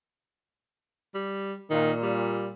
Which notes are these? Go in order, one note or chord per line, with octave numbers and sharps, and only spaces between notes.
G3
A#2 D#3
G3